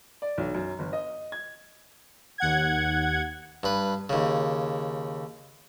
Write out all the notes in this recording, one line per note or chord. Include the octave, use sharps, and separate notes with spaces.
D5
B1
F#2
G1
D#5
G#6
D#2 F#5 G#6
G2 B4
D#2 C#3